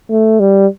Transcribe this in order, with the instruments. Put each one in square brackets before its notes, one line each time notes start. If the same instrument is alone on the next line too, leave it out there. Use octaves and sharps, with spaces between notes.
[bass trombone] A3
G3